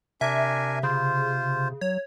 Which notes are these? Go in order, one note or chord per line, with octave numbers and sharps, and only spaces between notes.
C3 D4 A#4 E5 G#5
C#3 F4 C5
F#3 C#5